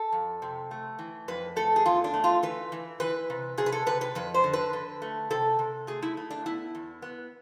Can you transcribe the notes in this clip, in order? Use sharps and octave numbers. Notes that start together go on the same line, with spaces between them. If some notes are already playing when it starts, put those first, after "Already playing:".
Already playing: A4
F2
C3
A3
E3
F2 B4
A3 A4
G#4
E2 F4
D4
A3
F4
E3 B4
E3
E3 B4
C3
C3 G#4
B4
A4
C3 B4
B4
F2 B4
C5
D3
B4
D3
A3
C3 A4
C3
A3 G#4
E4
A3
D4
B3 E4
E2
B3